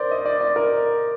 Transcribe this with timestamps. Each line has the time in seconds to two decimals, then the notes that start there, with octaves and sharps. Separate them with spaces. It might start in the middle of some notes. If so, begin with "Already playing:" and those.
Already playing: A#4 C5 D5
0.11 D#5
0.26 D5
0.41 D5
0.56 A#4